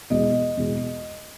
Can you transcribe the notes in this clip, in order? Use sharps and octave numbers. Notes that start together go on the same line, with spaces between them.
E2 B2 G#3 D#5
E2 B2 G#3